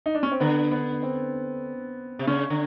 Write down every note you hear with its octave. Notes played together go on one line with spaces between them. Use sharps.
D#4
D4
C#4
C4
D3 B3
B3
C4
C3
C#3 C#4
D3